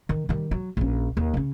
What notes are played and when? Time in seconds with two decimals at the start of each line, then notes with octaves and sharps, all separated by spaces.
0.09 D#3
0.29 D#3 G3
0.51 F#3
0.77 A#1 C#4
1.17 D#2
1.34 C#3 C#4